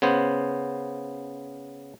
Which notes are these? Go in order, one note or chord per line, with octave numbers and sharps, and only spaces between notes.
C#3 B3 C5